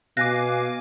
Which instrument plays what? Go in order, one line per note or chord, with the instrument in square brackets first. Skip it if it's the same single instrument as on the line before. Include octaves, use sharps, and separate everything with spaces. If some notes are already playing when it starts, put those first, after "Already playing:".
[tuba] B2 [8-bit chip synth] F5 G#5 D6 [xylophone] F#6 A#6